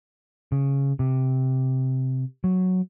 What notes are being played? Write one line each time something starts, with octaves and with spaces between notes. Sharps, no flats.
C#3
C3
F#3